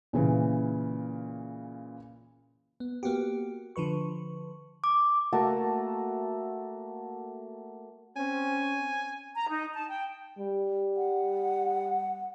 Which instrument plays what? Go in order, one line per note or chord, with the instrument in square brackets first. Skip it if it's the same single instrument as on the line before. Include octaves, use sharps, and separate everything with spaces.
[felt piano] A#2 C#3 E3
[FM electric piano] B3
A#3 B3 F#4 G4
D3 F3 B4 C#6
[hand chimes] D6
[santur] A3 A#3 F#4 A5
[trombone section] C4 C#4 [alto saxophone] G#5
[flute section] A#5
D#4
A5
G5
[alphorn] G3
[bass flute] F#5